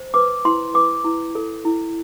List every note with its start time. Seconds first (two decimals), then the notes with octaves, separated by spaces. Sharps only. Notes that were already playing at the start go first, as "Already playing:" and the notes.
Already playing: C5
0.14 B4 D6
0.45 E4 C6
0.74 B4 D6
1.05 E4
1.35 A4
1.65 E4